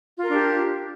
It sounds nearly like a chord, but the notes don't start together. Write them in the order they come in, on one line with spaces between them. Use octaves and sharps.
F4 A#4 D4 G4